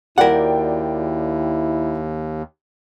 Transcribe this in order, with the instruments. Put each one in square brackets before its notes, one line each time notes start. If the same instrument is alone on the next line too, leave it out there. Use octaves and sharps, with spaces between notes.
[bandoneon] D#2 [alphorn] E4 [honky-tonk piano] F#4 D5 G5 [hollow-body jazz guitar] A#4 F#5